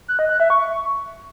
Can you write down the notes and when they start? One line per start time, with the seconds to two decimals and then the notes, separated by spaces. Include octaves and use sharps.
0.08 F#6
0.19 D#5
0.29 F#6
0.40 E5
0.50 C#6